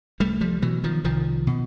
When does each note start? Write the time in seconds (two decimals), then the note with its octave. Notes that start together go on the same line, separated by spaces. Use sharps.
0.20 C2 G3 A3
0.41 F3 G3
0.62 B2 E3 F#3
0.84 D#3 F3
1.04 C2 D#3 F3
1.47 B2